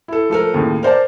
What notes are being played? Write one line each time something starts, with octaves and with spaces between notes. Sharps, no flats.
E4 A4
F3 A3 A4 A#4
D#2 A2 C#3
A#4 C5 D5 A5